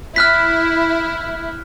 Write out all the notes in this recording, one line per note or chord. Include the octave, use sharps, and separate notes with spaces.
E4 F6 F#6 B6